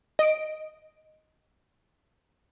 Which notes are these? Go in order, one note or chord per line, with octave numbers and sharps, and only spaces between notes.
D#5 D7